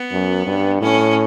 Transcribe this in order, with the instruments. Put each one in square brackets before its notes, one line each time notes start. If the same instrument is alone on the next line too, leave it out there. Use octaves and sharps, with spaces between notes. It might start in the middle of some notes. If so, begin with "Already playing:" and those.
Already playing: [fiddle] B3
[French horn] F#2
G2
[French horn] A2 [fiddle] C#4